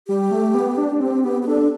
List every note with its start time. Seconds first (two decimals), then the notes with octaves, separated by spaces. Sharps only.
0.08 G3 G4
0.31 A3
0.54 B3
0.78 D4
0.92 D4
1.00 C4 G4
1.24 B3 G4
1.43 G4
1.47 D4 A4